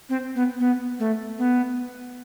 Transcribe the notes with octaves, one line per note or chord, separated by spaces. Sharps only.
C4
B3
B3
A3
B3